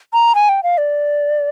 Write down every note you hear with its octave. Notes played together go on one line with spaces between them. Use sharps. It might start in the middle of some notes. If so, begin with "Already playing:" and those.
A#5
G#5
G5
F5
D5